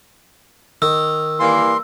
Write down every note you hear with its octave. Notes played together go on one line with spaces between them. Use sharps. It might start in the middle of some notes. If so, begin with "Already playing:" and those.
D#3 E6
E3 G3 A#3 C6